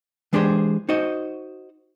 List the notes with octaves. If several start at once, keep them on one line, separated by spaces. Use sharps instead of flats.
E3 G#3 D4 G4 G#4 C5
D#4 F#4 C5 D#5